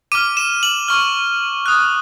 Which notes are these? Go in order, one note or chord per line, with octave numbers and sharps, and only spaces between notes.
D6 F6 D#7
E7
F#7
C#6 F6
D#6 F#6